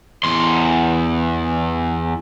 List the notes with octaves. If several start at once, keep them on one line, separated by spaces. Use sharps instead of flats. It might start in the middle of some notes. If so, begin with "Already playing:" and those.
E2 C6